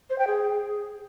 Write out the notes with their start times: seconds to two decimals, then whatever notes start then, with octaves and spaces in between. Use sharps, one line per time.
0.10 C5
0.19 G5
0.27 G#4